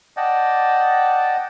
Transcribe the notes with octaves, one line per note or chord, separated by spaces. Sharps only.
D5 D#5 F#5 G5 A5